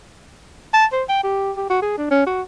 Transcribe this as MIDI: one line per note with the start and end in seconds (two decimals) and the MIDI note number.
0.73 0.85 81
0.93 1.03 72
1.09 1.21 79
1.23 1.52 67
1.57 1.67 67
1.70 1.79 66
1.82 1.96 68
1.98 2.07 62
2.11 2.26 61
2.26 2.42 66